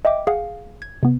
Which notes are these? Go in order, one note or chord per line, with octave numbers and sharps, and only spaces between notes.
D#5 E5 G5 D6
G#4 F5 F#5
G#6
C3 B3